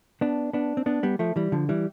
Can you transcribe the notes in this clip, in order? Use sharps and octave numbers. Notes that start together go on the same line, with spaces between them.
B3 D4
B3 D4
C4
B3 D4
G3 B3
F3 A3
E3 G3
D3 F3
E3 G3